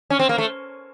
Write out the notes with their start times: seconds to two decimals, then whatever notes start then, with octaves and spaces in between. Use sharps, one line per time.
0.10 C#4
0.19 C4
0.29 A#3
0.38 A3